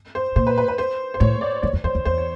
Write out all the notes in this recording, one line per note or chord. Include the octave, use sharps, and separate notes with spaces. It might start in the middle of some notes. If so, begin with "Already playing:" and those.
C5
A#2 C5
B4
B4
B4
C5
C5
A2 C#5
D5
F#2 C#5
F2
F2 C5
E2
E2 C5
C#5